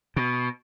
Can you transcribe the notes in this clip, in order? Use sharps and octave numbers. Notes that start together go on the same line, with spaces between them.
B2